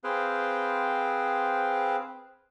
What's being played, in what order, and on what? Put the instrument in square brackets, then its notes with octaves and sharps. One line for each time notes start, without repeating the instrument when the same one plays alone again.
[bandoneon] C4 G#4 B4 C5 F5 G5